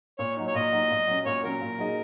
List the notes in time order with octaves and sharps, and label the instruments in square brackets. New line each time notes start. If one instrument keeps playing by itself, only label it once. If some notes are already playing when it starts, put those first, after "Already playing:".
[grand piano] A#2 [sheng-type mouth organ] C#5
[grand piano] F#3 D#4
[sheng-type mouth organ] C#5
[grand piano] A#2 [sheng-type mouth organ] D#5
[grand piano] F#3 D#4
A#2
F#3 C#4
[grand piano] A#2 [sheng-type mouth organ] C#5
[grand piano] F#3 C#4 [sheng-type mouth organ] A#4
[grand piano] A#2
F#3 D#4 G#4 D#5